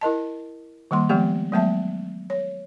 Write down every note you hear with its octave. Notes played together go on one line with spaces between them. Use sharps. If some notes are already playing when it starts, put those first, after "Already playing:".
E4 A#4 D#5 A5
D#3 G3 A#3 C6
F3 G#3 A3 B3 G4
F#3 G#3 A3 B3 E5 A5
C#5